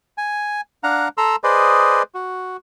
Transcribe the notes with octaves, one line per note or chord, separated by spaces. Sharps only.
G#5
D4 F5 F#5 A#5
A4 A#5 C6 E6
G#4 B4 C5 D5 D#5
F#4